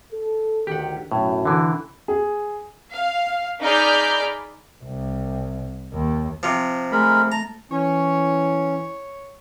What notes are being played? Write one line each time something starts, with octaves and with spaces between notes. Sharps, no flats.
A4
D2 D#3 G4 F#5
B1 F#2 A2
D3 E3
G#4
F5
D#4 G#4 D5 B5 F6 G6
C2
D#2
C3 F3
G#3 A3 A#4 B5
A5 A#5
E3 C#4 C#5